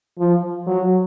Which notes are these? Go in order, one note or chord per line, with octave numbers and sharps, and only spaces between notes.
F3
F#3